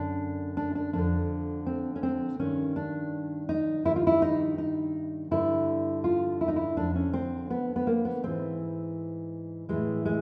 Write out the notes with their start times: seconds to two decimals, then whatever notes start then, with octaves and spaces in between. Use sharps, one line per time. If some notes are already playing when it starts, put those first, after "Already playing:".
Already playing: F#2 D3 D4
0.57 D4
0.75 D4
0.93 F2 D3 D4
1.66 C4
1.96 C#4
2.03 C4
2.39 G2 D#3 C#4
2.76 D4
3.49 D#4
3.85 G2 D#3 E4
3.96 F4
4.07 E4
4.22 D#4
4.58 D#4
5.31 G2 D3 E4
6.04 F4
6.41 E4
6.48 D#4
6.56 E4
6.77 F2 D3 D4
6.96 C#4
7.13 C4
7.50 B3
7.76 B3
7.87 A#3
8.05 B3
8.23 G#2 E3 C4
9.69 A2 E3 G#3
10.05 G#3